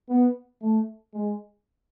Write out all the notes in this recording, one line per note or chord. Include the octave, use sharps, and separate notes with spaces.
B3
A3
G#3